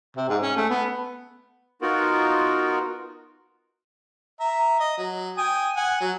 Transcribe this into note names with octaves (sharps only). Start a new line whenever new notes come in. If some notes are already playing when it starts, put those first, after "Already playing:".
C3
G#2
C#4
A3
B3
B3 D#4 F4 F#4 A#4
E5 A#5
D#5
F#3
G5 G#5 D#6
F#5 G#5
F#3